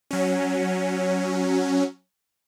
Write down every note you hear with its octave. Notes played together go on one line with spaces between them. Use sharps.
F#3 C#4